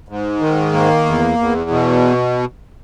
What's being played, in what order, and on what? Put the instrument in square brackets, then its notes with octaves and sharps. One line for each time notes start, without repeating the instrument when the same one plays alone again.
[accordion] G#2
D#3
A#3
E2
E2
B2